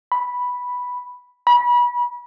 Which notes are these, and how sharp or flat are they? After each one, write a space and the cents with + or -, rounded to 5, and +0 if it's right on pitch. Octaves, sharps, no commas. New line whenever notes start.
B5 -5
B5 -35